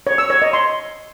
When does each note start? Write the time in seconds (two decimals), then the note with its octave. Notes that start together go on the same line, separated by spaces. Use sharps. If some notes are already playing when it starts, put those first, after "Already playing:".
0.07 C#5
0.18 E6
0.30 C#5
0.42 D#5
0.53 C6